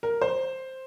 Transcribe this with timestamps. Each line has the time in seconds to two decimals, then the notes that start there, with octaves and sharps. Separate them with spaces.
0.03 A#4
0.21 C5